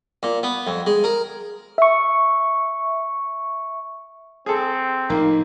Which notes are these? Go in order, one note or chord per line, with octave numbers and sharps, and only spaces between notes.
A#2
B3
F2
G#3
A#4
E5 C#6
C4 G#4 A4
A#1 A2 A#3 D#4